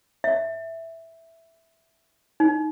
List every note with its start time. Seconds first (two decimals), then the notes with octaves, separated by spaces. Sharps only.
0.24 E5
2.40 D#4